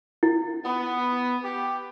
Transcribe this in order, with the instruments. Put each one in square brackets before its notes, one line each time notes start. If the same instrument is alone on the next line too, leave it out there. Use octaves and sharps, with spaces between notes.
[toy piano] E4
[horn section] B3
G4